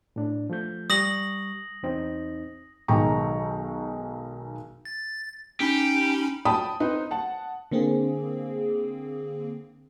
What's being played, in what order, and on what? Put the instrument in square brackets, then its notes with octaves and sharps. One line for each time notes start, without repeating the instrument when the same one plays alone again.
[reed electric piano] A2 D4
F3 A3 G6
[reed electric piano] G3 C#6 [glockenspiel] D#6 A#6 F#7
[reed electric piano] E2 C4 D#4
[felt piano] B1 D#3 G#3 G5 A#5 C#6
[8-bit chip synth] A6
[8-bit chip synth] C#4 D#4 B5 [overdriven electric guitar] G4
[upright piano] G5 A5 B5 D#6
C4 D#4 B4 C5
F#5 A5
[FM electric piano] D3 A#3 C4 G#4